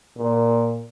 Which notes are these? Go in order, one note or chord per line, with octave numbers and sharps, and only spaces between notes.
A#2